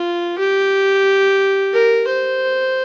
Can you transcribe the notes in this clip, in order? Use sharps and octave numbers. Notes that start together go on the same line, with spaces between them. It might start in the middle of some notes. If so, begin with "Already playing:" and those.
Already playing: F4
G4
A#4
C5